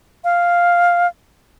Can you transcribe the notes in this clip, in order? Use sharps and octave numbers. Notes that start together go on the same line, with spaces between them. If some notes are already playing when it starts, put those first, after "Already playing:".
F5